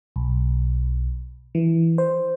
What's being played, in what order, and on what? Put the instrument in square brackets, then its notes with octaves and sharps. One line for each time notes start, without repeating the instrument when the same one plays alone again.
[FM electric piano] B1
E3
C5